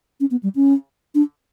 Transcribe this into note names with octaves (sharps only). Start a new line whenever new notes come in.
C#4
B3
G3
C#4
D4